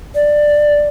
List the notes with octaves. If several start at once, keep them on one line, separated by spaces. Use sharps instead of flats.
D5